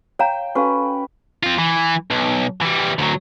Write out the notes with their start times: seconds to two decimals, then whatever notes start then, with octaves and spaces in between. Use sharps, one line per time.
0.19 C#5 F5 G5 A#5
0.55 C#4 F#4 A4 B4 F5
1.43 C4 F4
1.59 E3
2.10 B1
2.62 E3 G3
2.98 D2 F#3